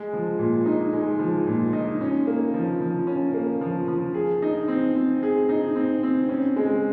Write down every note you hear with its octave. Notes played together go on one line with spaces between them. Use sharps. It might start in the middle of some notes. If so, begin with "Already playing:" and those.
Already playing: G#3
F3
A#2
D#4
G#3
F3
A#2
D#4
C#4
A#3
F3
F3
C#4
A#3
F3
F3
G#4
D#4
C4
C4
G#4
D#4
C4
C4
C#4
G#3